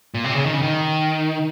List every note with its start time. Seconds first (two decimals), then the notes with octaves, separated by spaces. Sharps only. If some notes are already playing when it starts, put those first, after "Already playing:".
0.14 A#2
0.24 C3
0.35 C#3
0.45 D#3
0.54 C#3
0.62 D#3